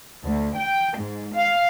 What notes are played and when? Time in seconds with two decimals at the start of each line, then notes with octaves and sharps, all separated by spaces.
0.23 D2
0.54 G5
0.97 G#2
1.35 F5